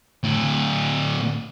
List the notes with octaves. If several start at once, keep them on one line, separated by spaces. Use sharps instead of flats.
A2 D3